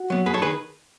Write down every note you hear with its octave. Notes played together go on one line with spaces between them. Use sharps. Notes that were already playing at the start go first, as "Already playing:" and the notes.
Already playing: F#4
F#3 B3
F#2 G#4 B4
A4 C#5
D#3 G#4 B4